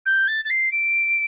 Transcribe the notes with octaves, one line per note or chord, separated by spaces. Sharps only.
G6
A6
A6
C7
D7